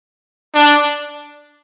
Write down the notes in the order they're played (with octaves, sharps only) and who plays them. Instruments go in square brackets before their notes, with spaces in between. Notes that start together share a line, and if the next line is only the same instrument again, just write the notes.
[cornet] D4